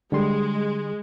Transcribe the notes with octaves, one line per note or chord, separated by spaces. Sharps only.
D3 G3 G#3 C6